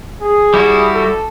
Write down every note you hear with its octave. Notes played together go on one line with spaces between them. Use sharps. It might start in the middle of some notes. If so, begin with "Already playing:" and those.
G#4
G3 E4 F#4
A4